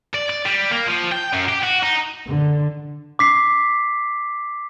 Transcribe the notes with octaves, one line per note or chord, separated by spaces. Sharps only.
D5
D5
G3
A#3
F3
G5
F#2
G4
F#4
D#4
D3
D6 B6 C7